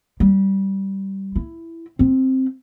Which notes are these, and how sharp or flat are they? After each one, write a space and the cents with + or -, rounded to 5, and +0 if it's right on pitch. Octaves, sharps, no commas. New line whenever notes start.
G3 -15
E4 +10
C4 +5